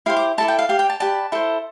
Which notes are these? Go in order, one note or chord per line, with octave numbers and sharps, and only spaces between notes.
E4 G4 C5 F5
D6
E4 A4 D5 A5
G5
F5
G4 D5 F5
G5
A5
G4 B4 D5 A5
E4 A4 C5